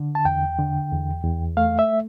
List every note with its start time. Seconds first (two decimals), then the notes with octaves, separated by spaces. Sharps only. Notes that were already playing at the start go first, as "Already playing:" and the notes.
Already playing: D3
0.15 A5
0.25 E2 G5
0.59 D3
0.92 E2
1.24 E2
1.57 A3 F5
1.79 E5